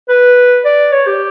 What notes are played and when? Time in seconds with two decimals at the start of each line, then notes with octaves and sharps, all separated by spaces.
0.09 B4
0.64 D5
0.92 C#5
1.07 G4